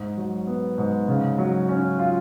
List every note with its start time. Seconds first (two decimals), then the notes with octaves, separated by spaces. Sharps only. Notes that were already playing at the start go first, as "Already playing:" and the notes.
Already playing: G#2
0.17 F#3
0.47 B3
0.78 G#2
1.08 C#3
1.38 F#3
1.69 C#4
1.99 F4